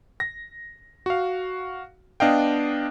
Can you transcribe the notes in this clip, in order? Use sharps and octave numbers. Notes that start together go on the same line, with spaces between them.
A#6
F#4 F5
B3 D4 D#5 F5 G5